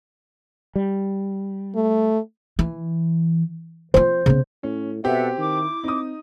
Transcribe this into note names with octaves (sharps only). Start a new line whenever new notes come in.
G3
A3
E3
F3 F4 C5
C#3 B3
A2 C#4
B2 C4 G4 A4 E5 F#5
D#3 E4 D6
C4 D#4 D#6